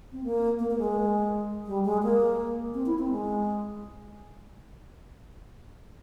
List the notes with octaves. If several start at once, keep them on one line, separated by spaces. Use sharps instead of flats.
C4
A#3
A#3
A#3
G#3
G3
G#3
A#3
C4
E4
C4
G#3